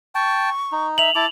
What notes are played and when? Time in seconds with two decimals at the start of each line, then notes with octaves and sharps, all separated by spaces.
0.15 G5 A5 C#6
0.72 D#4
0.98 E5 F7 F#7
1.15 E4 A5 D6